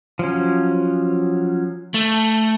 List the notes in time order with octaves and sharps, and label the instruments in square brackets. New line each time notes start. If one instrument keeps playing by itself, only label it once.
[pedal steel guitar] F3 F#3 C#4
[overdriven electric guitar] A3